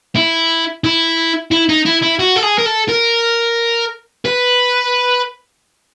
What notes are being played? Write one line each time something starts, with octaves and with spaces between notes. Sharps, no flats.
E4
E4
E4
D#4
E4
E4
F#4
A4
G#4
A#4
A4
A#4
B4